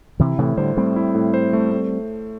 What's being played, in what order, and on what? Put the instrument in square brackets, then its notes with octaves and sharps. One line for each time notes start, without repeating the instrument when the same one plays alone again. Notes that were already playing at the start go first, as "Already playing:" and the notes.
[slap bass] C3 E3 [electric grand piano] E4
[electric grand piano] A2 [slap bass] C3 E3
[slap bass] D3 G3 [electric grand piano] C5
[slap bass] G3 C4 [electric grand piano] A3
[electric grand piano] E4
A2
C5
A3
A3